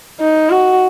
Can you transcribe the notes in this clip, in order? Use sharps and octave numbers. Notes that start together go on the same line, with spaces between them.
D#4
F#4